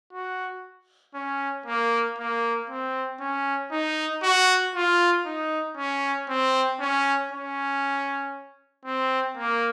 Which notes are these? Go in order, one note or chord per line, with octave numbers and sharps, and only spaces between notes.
F#4
C#4
A#3
A#3
C4
C#4
D#4
F#4
F4
D#4
C#4
C4
C#4
C#4
C4
A#3